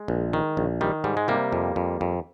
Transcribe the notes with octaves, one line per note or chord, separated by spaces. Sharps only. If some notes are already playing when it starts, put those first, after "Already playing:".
Already playing: G#3
A#1
D#3
A#1
D#3 G3
G#2 G3
G#3
C3 G3 A#3
F2
F2
F2